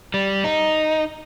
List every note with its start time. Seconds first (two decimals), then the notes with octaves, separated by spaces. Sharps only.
0.14 G3
0.44 D#4